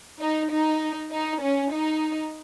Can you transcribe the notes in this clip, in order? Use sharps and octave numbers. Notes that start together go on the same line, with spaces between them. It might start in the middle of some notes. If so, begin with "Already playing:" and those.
D#4
D#4
D#4
C#4
D#4